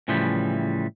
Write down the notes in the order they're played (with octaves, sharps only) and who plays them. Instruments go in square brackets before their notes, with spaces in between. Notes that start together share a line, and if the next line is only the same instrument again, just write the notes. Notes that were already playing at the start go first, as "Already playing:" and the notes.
[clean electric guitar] A2 C#3 E3 F3 G3